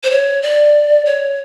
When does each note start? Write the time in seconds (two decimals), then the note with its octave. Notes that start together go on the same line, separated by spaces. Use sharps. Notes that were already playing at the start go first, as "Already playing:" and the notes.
0.04 C5
0.10 C#5
0.42 D5
1.05 C#5